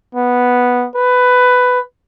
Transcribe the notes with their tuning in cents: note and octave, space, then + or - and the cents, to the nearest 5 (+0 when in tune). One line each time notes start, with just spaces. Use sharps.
B3 -5
B4 +10